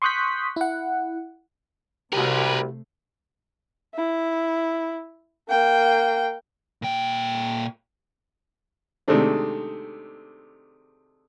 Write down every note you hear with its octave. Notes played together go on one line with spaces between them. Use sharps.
C6 C#6 D#6 F#6 G6 B6
E4 F#5
C2 C3 A3 F#4 G4 A#4 B4
E4
A#3 G5
A#2 G5
C3 D#3 G#3 A3 D4